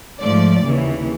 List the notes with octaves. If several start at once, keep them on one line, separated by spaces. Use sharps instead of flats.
G#2 F3 A3 D5
D#2 C#3 E3